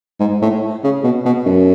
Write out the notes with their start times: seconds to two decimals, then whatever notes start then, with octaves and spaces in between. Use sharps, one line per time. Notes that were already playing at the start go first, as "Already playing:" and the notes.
0.20 G#2
0.42 A2
0.84 C#3
1.04 B2
1.26 B2
1.46 F#2